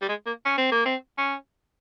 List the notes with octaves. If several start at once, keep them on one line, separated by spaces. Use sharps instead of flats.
G3
G#3
A#3
C#4
C4
A#3
C4
C#4